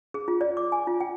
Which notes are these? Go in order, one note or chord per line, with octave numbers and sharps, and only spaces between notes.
G#4
F4
D5
D6
G#5
F4
G5